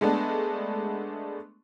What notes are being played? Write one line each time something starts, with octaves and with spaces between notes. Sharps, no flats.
G#3 A3 B3 D4